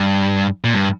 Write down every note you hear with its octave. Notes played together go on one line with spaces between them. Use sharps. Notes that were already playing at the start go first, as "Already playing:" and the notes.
Already playing: G2
A#2
G2